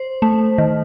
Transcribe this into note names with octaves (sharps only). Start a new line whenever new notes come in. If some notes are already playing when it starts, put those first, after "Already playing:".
Already playing: C5
A3
D#3